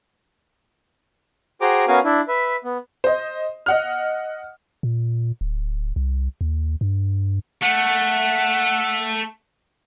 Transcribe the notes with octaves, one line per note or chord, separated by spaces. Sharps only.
F#4 G#4 C5 G5 A#5 D6
B3 C#4 F#4 A#4 F5 G#5
D4 E4
B4 E5
B3
C5 D#5
D#5 F#5 F6
A#2
D1
C2
D#2
G2
A3 F#5